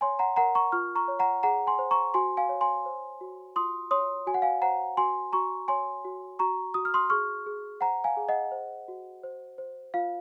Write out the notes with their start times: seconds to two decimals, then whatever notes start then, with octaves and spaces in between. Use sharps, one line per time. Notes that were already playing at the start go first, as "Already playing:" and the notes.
0.01 C#5 G#5 C6
0.19 F#5 A#5
0.36 A#4 F#5 A#5
0.55 A#5 C#6
0.72 F4 C#6 F6
0.96 A#5 C#6
1.08 C#5
1.19 F#5 A#5
1.43 G#4 F#5 A#5
1.67 G#5 C6
1.79 C5
1.91 A#5 C#6
2.14 F#4 G#5 C6
2.37 F5 G#5
2.49 C#5
2.61 G#5 C6
2.86 C5
3.21 F#4
3.56 F4 C6 D#6
3.91 C#5 C6 D#6
4.27 F#4 G#5
4.34 F#5
4.42 F5 G#5
4.62 C5 F#5 A#5
4.97 F#4 G#5 C6
5.33 F#4 A#5 C#6
5.68 C#5 G#5 C6
6.05 F#4
6.39 F#4 A#5 C#6
6.74 F#4 D#6
6.85 F6
6.94 C6 D#6
7.10 G#4 C#6 F6
7.46 G#4
7.81 C5 F#5 A#5
8.04 F5 G#5
8.17 G#4
8.29 D#5 F#5
8.52 C5
8.88 F#4
9.23 C5
9.58 C5
9.94 F4 F5